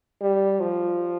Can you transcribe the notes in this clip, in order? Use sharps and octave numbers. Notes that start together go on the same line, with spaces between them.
G3
F3